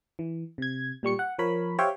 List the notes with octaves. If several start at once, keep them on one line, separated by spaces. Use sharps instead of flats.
E3
C3 G#6
A#2 G3 C#6 C#7
F#5
F3 A#4 C#5 B5
G4 C5 C#5 E5 F5 G5